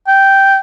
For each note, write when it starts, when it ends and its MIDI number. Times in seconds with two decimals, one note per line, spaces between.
0.08 0.57 79